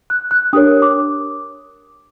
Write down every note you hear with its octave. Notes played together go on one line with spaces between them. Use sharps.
F#6
F#6
D4 G4 A#4 C#5 D#6
D6